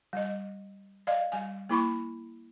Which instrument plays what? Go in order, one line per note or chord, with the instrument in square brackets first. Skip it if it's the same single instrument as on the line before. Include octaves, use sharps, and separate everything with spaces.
[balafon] G3 D#5
D5 D#5 F5
G3 G#5
A#3 E4 B5 C#6